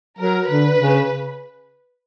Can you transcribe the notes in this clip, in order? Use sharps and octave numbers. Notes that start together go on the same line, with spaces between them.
F#3 A#4
D3 B4
C#3